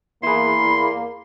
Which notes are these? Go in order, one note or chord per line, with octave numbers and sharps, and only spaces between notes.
E2 A#3 E4 G#4 B5 C6